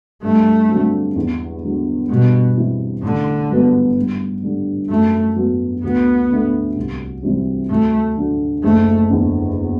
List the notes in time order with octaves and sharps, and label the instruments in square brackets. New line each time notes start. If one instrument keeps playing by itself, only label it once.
[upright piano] G2 [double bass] A3
[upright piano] D3 F#3 C4
E2
D3 F#3
[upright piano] G2 [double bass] B2
[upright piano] E3 G3 C4 E4
[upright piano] A1 [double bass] D3
[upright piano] G2 F#3 B3
G2
D3 G3 D4
[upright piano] F#2 [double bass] A3
[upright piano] F#3 B3
[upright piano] D2 [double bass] B3
[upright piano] D3 A3
C2
C3 E3 G3 C4
[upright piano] D2 [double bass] A3
[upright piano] D3 F#3
[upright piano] F#1 [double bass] A3
[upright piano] E2 D3